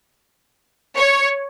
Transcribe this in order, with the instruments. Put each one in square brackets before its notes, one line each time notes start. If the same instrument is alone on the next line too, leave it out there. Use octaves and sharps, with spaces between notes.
[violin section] C#5